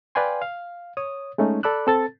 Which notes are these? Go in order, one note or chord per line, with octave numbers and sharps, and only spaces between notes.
B4 D5 F5 G5 G#5 C6
F5
C#5 D#6
G#3 A3 C#4 D#4
A4 D5 B5 D6 E6 F#6
C4 A4 A6